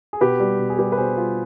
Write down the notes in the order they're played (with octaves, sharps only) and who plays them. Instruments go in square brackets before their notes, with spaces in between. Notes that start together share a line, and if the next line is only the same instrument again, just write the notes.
[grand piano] G#4
B2 G4 B4
G3
B2
G#4
G3 G4 B4
B4
B2 G#4 C5
G3 F4 G#4